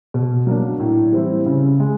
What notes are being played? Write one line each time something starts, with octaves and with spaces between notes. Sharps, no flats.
B2
F#3 A#3 D4
A2
E3 G3 C4 E4
C#3
G#3